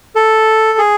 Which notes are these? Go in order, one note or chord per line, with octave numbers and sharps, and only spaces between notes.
A4
G#4